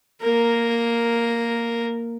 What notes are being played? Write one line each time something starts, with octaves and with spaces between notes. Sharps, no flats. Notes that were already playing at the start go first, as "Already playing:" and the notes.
A#3 A#4